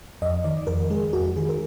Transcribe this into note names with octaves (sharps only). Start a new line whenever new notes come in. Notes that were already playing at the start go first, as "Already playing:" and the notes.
F2 D#5
D#3 D5
F2 A#4
G#3 G#4
F2 F#4
D#3 G#4
A#4